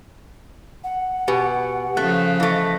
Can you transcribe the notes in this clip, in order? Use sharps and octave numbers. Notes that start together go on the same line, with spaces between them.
F#5
B2 G4 B4 G#5
C#3 F3 A3 F#6
E3 A3 D#5